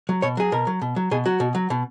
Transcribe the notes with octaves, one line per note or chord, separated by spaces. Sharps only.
F#3
B2 C#5
F#3 G#4
B2 A#4
F#3
B2
F#3
B2 G#4
F#3 F#4
B2
F#3
B2